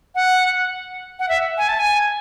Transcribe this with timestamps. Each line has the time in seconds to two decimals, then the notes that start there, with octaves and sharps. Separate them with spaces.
0.15 F#5
1.19 F#5
1.29 E5
1.58 G#5
1.68 A5
1.79 G#5